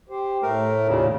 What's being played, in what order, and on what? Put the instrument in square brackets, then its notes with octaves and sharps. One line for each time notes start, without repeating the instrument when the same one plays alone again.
[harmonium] G4 C5
[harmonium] A2 [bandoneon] A3 A#4
[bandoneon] D#2 A#2 C#3